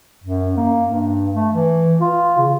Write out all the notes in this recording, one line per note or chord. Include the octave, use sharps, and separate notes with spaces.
F#2
A#3
G2
A3
E3
F4
C#3